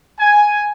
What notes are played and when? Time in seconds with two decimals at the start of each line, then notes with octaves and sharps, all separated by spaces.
0.19 G#5